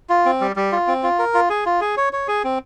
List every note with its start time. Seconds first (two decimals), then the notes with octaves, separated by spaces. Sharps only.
0.10 F4
0.26 C4
0.41 G3
0.56 G3
0.72 F4
0.87 C4
1.03 F4
1.19 A#4
1.34 F4
1.50 G#4
1.66 F4
1.81 G#4
1.97 C#5
2.13 C#5
2.28 G#4
2.44 C4